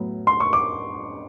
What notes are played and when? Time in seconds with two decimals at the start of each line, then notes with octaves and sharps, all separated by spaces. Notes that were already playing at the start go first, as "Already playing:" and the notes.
Already playing: A2 F#3 B3
0.27 C6
0.40 C#6
0.53 D6